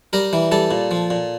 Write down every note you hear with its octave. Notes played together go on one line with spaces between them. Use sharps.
G3 A#4
E3
G3 A4
A#2
F3
A#2